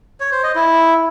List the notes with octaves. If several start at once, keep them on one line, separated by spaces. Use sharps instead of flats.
C#5
C5
D#5
E4